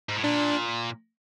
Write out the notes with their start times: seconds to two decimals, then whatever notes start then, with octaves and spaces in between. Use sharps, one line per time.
0.09 G#2
0.16 A2
0.24 A#2 D4